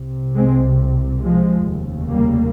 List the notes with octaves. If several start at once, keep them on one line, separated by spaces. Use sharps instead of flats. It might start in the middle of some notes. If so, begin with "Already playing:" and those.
Already playing: C2 C3
G#3 C4
F3 G#3
F1 D#2 C#3
G3 A#3